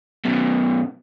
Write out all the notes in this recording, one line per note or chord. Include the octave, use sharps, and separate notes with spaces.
F#2 B2